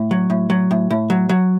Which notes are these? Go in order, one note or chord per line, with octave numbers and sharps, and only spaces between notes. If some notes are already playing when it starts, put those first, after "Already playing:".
Already playing: A2
F#3
A2
F#3
A2
A2
F#3
F#3